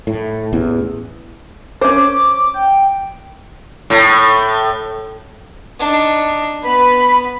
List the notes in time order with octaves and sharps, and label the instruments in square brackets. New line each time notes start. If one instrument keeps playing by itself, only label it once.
[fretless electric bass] A2
A1 E2
[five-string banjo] C#4 C5 [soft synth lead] D6
[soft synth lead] G5
[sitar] A2
[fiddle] D4 D#4
[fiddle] B3 B4 [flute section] B5